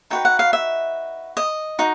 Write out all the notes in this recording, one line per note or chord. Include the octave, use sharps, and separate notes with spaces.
D#4 F#4 B4 G5
F#5
F5
E5
D#5
D#4 F#4